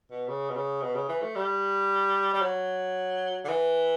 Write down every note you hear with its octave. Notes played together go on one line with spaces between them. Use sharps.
B2
C#3
B2
C#3
B2
C#3
E3
A3
G3
G3
F#3
D3
E3